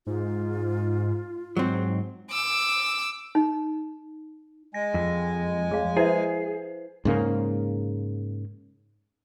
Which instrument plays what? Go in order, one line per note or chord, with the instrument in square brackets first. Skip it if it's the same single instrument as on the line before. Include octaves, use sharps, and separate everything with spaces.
[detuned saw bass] G#2 [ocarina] F4
[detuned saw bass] G#2 [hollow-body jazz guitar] F#3 C4
[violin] D6 E6
[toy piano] D#4
[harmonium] G#3 G#5 [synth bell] A#6
[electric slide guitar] F2
[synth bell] F3 [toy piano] G#4 F5
[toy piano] E4 E5 [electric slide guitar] G#4 [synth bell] B4 C5
[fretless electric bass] G#2 C#3 A#3